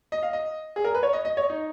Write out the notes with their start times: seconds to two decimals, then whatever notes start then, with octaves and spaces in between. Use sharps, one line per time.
0.12 D#5
0.23 F5
0.33 D#5
0.76 G#4
0.84 A#4
0.95 B4
1.03 C#5
1.13 D#5
1.25 D#5
1.37 C#5
1.50 D#4